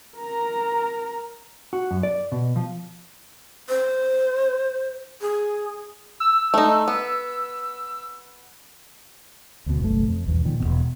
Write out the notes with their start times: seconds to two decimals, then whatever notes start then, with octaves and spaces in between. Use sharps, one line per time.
0.17 A#4 A#5
1.73 F#4
1.91 F#2
2.03 D5
2.32 B2
2.56 F3
3.69 C5
5.21 G#4
6.20 E6
6.54 A3 D#4
6.88 B3
9.66 D2 B2
9.80 F#1 B1 A3
10.08 F2
10.26 B1 E2 G2
10.45 A#2 D#3 F3
10.60 E1 C#2 B2